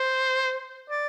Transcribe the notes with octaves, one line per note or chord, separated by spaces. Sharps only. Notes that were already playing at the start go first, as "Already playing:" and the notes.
Already playing: C5
D5